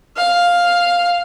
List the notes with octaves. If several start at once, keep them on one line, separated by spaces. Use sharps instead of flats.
F5